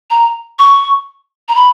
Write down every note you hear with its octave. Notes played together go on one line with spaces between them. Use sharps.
A#5
C#6
A#5
B5